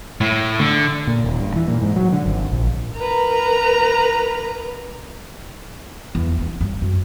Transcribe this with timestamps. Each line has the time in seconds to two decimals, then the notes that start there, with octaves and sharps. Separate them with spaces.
0.21 A2
0.59 D3
1.07 A#2
1.24 D#1
1.40 G2
1.56 E3
1.67 A#2
1.82 G#2
1.96 F#3
2.12 D3
2.26 G#1
2.52 A#1
2.98 A#4 B4 A#5
6.15 E2
6.39 D4
6.61 G2
6.82 F#2